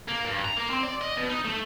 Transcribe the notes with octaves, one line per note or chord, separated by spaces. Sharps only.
A#3
G2
A#5
A#3
C4
D5
D#5
B2
D#4
A3